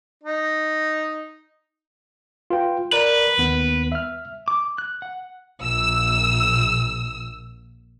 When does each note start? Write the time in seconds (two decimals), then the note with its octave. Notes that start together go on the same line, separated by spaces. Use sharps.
0.23 D#4
2.50 F4 B4 G5
2.92 A#4 B4 D5 A#5
3.38 D#2 D#3 B3
3.92 E5 F6
4.48 D6
4.78 F#6
5.02 F#5
5.63 A#1 E6